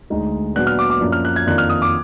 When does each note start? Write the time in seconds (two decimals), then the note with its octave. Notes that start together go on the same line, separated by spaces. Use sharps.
0.10 D2 D3 G#3 D#4
0.55 A#2 F#3 B3 D4 F#6
0.67 F6
0.79 D6
0.90 D6
1.01 F#2 F3 A#3 D4
1.12 F6
1.25 F#6
1.36 G#6
1.47 F2 D#3 A#3 D4 F4 F#6
1.58 F6
1.70 D#6
1.82 D6